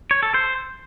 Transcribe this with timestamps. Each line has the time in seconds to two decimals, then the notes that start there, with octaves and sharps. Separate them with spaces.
0.11 C#5
0.23 A4
0.34 C5